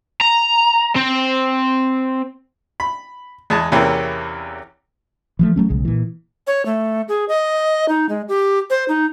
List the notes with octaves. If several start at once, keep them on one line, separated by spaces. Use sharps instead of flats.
A#5
C4
B5
E2 G#3 A5
E2 C3 E3 A#3 C4 C#4
E3 F3 A3
F#3 A3 C#4
B1 C#3 G#3
A#2 E3
C#5
A3
G#4
D#5
D#4
G#3
G4
C5
D#4